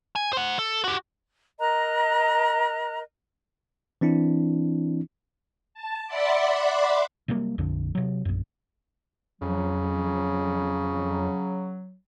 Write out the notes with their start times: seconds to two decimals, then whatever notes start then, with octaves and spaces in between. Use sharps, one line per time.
0.16 G#5
0.33 C5 F#5
0.59 A4
0.84 F#4 G4
1.60 A#4 D#5 A#5 F#6
4.01 E3 C4 D4 E4
5.74 A5
6.07 D5 E5 F#5 B5 C6 D6
7.28 C3 F#3 G3 A#3
7.58 A#1 F2 D3
7.95 C3 F#3
8.25 A#1 F#2
9.41 F2 C#3 F#3